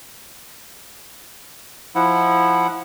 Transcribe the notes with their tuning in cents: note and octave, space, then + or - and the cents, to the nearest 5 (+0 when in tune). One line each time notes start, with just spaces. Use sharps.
F3 +0 E4 +0 F#5 +0